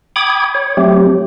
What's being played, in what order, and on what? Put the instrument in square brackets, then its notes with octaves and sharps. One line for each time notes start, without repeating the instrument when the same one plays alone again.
[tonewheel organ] G5 B5 D6 D#6 G#6
C#5
F#3 A3 C4 G4